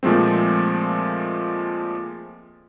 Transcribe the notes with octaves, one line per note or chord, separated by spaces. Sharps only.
A#2 F3 G#3 A3 C4